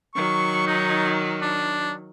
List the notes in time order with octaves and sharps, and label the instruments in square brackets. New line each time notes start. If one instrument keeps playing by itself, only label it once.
[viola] D#3 F#3 [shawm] C#6
[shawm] D#4
D4